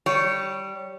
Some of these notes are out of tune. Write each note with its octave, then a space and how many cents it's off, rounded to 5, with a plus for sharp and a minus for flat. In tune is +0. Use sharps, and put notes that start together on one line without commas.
G3 -15 C#5 +0